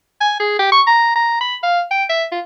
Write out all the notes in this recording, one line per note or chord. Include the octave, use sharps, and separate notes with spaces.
G#5
G#4
G4
C#6
A#5
A#5
B5
F5
G5
E5
F4